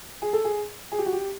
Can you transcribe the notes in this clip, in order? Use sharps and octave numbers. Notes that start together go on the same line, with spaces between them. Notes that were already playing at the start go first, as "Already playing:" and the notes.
G#4
A4
G#4
G#4
G4
F#4
G4